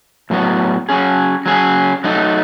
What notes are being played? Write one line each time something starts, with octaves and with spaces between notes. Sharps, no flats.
A2 F#3 B3
F#3 C#4 G#4
F#3 C#4 G#4
F#3 A3 D#4